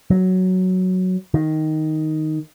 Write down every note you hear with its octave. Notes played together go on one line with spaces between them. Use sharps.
F#3
D#3